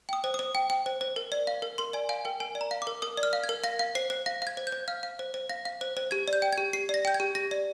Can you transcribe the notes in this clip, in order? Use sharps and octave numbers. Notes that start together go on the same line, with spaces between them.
G5 D#6
C5
C5 D#6
G5
G5
C5
C5
A#4
D5
F5
A#4
A#4 C6
D5 G#5
F5 G#5
A#4 G5
A#4 G#5
D5
A#5
F5
D6
A#4
A#4 D#6
D5
F6
F5
G#6
A#4
F5 A#6
F5
C5 C7
C5
F5 A#6
F5 G#6
C5
G6
C5
F5 F6
F5
C5
C5
F5 A#6
F5
C5
C5
G4 G#6
D5
G6
G5
G#6
G4
G4 C7
D5 A#6
G5 G6
G#6
G4
G4 A#6
D5